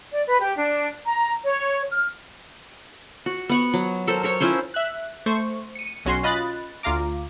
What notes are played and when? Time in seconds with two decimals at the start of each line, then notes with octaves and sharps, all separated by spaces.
0.12 D5
0.27 B4
0.40 G4
0.55 D4
1.04 A#5
1.45 C#5
1.91 F6
3.26 F#4
3.49 B3 F#5 C#6
3.73 F#3
4.08 A4 A#4 C5
4.23 A4 A#4 C#5
4.40 C#4 E4 F4 C5
4.74 E5 F#6
5.26 A3 C5 C#6
5.75 C#7 D#7
6.05 B1 C#4 F#4 C6 C7
6.23 C#4 F4 D#5 B5 F#6 A6
6.83 D2 F4 F5 A#5 D6